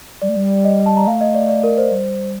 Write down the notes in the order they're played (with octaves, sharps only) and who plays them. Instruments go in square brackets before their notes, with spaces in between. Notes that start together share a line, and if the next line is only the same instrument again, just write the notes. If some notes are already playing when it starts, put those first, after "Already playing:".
[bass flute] G3 [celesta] D5
[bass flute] A3
G3
[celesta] D#5
A5
A#5
[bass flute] A3 [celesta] F5
[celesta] D#5
D5
D5
A#4
C5
[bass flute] G3